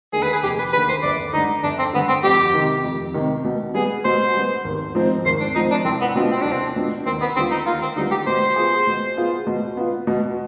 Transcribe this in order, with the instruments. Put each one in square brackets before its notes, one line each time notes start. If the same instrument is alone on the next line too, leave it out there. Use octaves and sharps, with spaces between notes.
[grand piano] D#2 D3 [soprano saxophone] G#4
[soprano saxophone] B4
G#4
[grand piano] F1 [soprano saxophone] G4
[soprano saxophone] B4
[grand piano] D#2 D3 [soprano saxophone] B4
[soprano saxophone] C5
[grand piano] G1 [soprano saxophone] D5
[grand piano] G2 D3 [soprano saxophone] D#4
[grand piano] G1 [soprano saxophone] D4
[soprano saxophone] C4
[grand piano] G2 D3 [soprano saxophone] B3
[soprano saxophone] C4
[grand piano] F2 [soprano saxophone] G4
[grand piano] C3 D#3
F2
C3 D#3
B2
[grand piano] G3 B3 [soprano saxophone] G#4
[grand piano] B2 [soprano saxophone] C5
[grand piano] G3 B3
G#1
G#2 F3 C4
[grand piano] G#1 [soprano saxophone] C5
[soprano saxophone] D4
[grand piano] G#2 F3 C4 [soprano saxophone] D#4
[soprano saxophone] D4
[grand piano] C2 [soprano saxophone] C4
[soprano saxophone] B3
[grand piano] B2 B3 D4 F4 [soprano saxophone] C4
[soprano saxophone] C4
[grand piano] C2 [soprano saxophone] D4
[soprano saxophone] C4
[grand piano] B2 B3 D4 F4
[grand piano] D#2 [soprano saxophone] C4
[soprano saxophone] B3
[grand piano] D3 G3 B3 F4 [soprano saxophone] C4
[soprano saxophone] D#4
[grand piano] D#2 [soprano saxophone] F4
[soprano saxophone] C4
[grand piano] D3 G3 B3 F4 [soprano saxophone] D#4
[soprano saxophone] G4
[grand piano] B2 [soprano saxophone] C5
[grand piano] B3 F4 G#4
B2
B3 F4 G#4
B2
B3 F4
B2